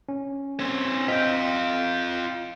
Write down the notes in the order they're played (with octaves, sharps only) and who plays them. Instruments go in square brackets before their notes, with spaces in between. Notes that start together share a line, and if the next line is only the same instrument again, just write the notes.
[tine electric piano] C#4
[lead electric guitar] C4 C#5
[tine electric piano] C4 D#5 B6 [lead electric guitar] F4 G5